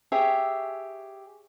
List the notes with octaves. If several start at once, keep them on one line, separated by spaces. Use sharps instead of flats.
G4 G#4 C#5 E5